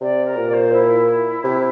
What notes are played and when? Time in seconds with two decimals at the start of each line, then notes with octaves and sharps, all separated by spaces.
0.01 C3 D5
0.25 A#4
0.36 A#2
0.48 D5
0.53 C5
0.72 E4
1.44 C3